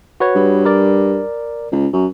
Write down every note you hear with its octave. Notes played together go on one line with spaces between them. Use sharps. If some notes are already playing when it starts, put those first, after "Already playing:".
F#4 B4 C#5
G2
A#4 D5
C#2
F#2